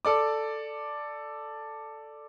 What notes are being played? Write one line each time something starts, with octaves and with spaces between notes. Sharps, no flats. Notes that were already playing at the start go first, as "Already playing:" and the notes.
A4 D5 D6